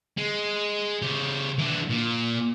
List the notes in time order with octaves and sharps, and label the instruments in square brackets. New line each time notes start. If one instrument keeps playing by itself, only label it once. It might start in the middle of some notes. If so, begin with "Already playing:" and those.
[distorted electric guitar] G#3
C#3 G4
E3 D4
A#2